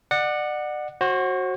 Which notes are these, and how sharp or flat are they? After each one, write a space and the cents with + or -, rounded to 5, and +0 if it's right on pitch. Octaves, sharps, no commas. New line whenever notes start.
D5 +35 F#5 -5
F#4 +0 C5 +40